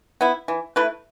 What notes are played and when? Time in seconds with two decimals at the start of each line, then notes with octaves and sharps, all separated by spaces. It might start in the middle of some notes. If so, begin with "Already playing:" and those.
0.21 B3 E4
0.48 E3
0.76 A3 E4 B4